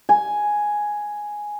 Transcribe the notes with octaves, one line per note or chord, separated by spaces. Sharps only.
G#5